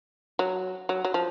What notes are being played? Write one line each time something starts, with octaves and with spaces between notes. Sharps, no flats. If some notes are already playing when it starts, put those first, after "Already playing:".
F#3
F#3
F#3
F3